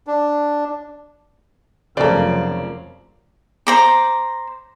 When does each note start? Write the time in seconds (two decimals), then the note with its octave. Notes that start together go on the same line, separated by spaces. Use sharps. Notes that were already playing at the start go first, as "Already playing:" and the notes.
0.07 D4
1.97 F1 C#3 F3 F#3 A#3 A4 C5 D5
3.67 C5 A#5 D6